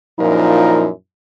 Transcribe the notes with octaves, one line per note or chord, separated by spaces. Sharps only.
F#2 A#2 F3 D#4 E4 A#4